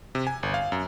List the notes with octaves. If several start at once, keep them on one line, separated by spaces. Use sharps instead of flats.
C3
G#5
G1
F5
F#2